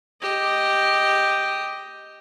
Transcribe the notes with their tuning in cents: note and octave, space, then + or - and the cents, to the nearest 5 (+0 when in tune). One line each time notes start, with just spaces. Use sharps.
G4 +0 D#5 +0